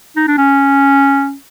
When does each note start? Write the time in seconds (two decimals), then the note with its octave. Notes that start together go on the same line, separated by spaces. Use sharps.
0.16 D#4
0.28 D4
0.38 C#4